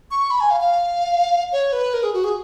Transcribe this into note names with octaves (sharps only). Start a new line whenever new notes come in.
C#6
B5
G#5
F5
F5
C#5
B4
A#4
G#4
F#4
G#4